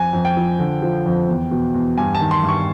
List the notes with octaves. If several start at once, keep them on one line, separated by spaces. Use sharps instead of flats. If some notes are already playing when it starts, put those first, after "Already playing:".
Already playing: F2 G#5
F2
G5
F3
D3
F3
F2
E2
B2
E2
G2 G#5
A5
D#3
C6
G2
C#6